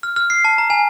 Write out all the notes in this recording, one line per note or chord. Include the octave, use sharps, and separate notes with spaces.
F6
F6
C7
A5
A#5
G#5